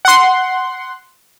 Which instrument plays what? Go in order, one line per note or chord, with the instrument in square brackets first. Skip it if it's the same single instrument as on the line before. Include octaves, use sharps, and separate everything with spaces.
[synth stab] F#5 C6